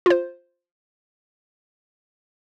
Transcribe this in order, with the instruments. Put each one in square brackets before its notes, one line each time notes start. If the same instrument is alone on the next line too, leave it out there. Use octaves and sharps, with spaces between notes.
[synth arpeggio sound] F4 C5